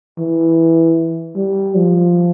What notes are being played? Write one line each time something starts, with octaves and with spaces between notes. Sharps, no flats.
E3
G3
F3